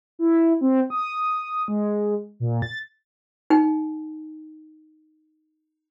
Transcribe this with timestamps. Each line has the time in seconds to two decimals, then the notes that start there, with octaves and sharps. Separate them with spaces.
0.19 E4
0.61 C4
0.90 D#6
1.68 G#3
2.40 A#2
2.62 A6
3.50 D#4 G5